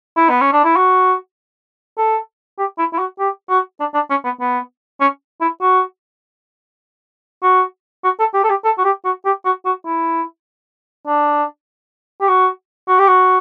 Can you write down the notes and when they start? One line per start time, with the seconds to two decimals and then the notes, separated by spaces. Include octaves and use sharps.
0.16 E4
0.29 B3
0.41 C#4
0.53 D4
0.64 E4
0.76 F#4
1.98 A4
2.59 G4
2.78 E4
2.93 E4
2.99 F#4
3.19 G4
3.49 F#4
3.80 D4
3.94 D4
4.10 C#4
4.24 B3
4.41 B3
5.01 C#4
5.41 E4
5.61 F#4
7.43 F#4
8.04 F#4
8.19 A4
8.34 G4
8.44 A4
8.50 G4
8.64 A4
8.78 F#4
8.84 G4
9.05 F#4
9.25 G4
9.45 F#4
9.65 F#4
9.86 E4
11.07 D4
12.21 G4
12.28 F#4
12.88 F#4
12.99 G4
13.08 F#4